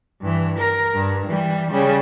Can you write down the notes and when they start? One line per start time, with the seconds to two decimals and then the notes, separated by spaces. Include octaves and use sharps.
0.21 G2 E3
0.58 A#4
0.95 G2
1.27 E3 G3
1.71 C#3 G3